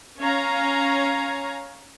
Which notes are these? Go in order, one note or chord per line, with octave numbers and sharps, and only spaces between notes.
C#4 C#5 F5 G#5 A#5